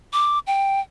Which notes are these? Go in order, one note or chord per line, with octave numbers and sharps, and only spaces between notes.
D6
G5